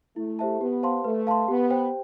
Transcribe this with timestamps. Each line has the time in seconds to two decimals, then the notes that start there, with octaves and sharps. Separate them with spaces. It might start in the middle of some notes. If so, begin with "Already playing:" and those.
0.16 A3 E4
0.39 G4 C5 E5 A5
0.60 B3 G4
0.83 C5 F5 A5 C6
1.04 A3 B4
1.27 F5 A5 C6
1.48 B3 G4
1.70 C5 G5